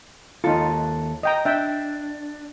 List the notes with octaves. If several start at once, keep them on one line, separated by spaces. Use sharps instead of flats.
D#2 D#4 F4 A4
D#5 G5 A#5
D4 E5 G5